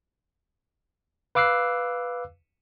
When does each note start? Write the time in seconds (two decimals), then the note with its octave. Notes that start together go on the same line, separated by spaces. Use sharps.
1.35 B4 F5 D6 E6 F#6 C7